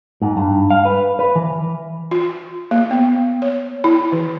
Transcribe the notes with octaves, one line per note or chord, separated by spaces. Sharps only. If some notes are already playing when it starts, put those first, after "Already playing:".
G#2
G2
F5
B4
B4
E3
F4
A#3
B3
C#5
E4
E3